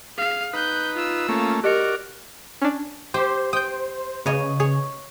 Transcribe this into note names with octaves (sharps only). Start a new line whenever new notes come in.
G#4 F5
D#4 B4 F#6 G6
F4 E6
A3 A#3 C#4
F#4 G4 A#4 D5 D#5 C#7
C#4 D4
G4 C5
G5 D#6 G6
C#3 C#5 D#5
G#4 C#5